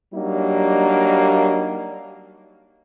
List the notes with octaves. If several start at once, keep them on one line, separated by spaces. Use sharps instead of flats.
F#3 G3 A#3 D4 D#4